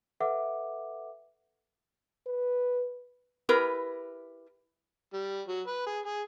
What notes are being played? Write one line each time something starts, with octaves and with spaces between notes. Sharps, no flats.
A4 B4 E5 F#5 D6
B4
E4 G4 A#4 B4
G3
F#3
B4
G#4
G#4